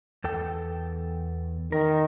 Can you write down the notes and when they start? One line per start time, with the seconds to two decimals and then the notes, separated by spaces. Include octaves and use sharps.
0.24 E2 A4 G5
1.72 D#3 A#4